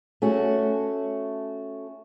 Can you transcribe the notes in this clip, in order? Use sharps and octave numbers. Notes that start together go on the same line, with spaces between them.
A3 C#4 F#4